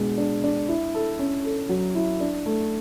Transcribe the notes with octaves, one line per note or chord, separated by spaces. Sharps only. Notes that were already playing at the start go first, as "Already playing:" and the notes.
Already playing: B2 G#3 D4
D4
D4
E4
A4
C#4
A4
F#3
E4
D4
A3